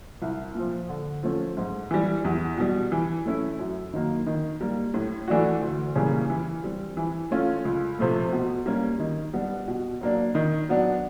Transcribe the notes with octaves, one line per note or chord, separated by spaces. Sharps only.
C2
A#2 F3
D3
F3 A3 C#4
G#2
E3 G3
E2
B2 G3
E3
A3 C#4 E4
F#2
D#3 F#3 A#3
D#3
G3 A#3
A2
E3 A3 D4 F#4
D2
C#3 E3 G3 A#3
E3
G3 C4
E3
A3 C#4 F4
C#2
C3 F3 A3
B2
G3 A#3 C#4
D#3
G3 B3 D4
B2
F#3 A#3 D4
D#3
F#3 B3 D4